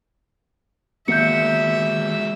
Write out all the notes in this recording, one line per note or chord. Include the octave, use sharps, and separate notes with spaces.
D#3 F#3 G#3 A#3 B3 E5 G6 C#7